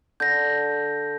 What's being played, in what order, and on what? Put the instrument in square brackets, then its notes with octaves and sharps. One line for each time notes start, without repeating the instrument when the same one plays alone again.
[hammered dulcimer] D3 [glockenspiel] G6 A#6